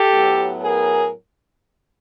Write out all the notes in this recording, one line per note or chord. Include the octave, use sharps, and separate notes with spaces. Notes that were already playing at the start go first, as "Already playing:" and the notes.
Already playing: G4 A4
A2 F#3 B3
G#4 A#4